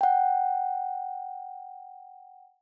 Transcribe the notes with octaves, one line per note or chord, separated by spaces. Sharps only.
F#5 G5